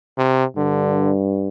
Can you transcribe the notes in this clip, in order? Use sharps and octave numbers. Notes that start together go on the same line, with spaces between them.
C3
G2 D3